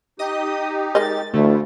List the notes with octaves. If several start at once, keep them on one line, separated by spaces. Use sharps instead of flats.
D#4 G4 D#5 D#6
G#3 A#4 D#5 A6
D2 D3 A3 E4 F4